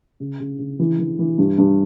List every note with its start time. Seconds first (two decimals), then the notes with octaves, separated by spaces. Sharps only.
0.20 C#3
0.40 C#3
0.59 C#3
0.79 E3
0.99 E3
1.19 E3
1.38 G2
1.58 G2